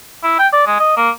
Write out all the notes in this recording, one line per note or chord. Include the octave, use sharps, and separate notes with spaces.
E4
G5
D5
G#3
D#5
A#3